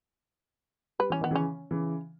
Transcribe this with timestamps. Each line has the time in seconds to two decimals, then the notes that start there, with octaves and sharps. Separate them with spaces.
0.99 G3 B4
1.10 E3 C#4
1.21 D#3 B3
1.31 C#3 E3 C#4
1.71 C#3 E3